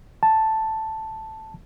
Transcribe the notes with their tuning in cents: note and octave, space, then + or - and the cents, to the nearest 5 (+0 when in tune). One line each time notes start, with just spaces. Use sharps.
A5 +0